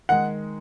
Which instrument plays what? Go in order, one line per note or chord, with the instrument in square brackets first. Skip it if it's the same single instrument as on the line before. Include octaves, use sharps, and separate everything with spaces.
[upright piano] D#3 G#3 [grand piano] F#5